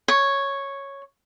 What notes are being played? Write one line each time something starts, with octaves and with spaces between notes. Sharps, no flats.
C#5